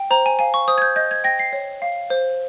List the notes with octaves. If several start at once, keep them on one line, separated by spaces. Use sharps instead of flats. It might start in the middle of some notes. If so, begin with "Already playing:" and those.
Already playing: G5
C5 A#5
G#5
F5 G#5
C#6
C5 D#6
G#6
G6
D#5 G6
G#6
G5 A#6
C7
C#5
F5
C5